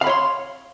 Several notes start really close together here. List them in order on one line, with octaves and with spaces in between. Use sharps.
F5 B5 C#5 C6